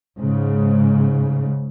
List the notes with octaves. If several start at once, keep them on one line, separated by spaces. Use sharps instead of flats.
G#2 C#3